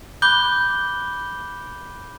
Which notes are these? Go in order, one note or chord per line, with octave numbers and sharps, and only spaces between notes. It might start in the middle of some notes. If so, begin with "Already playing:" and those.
B5 D6 F#6 G6 G7